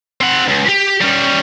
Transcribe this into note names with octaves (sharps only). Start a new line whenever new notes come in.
C4 F#5
C#2
G4
G3 C#4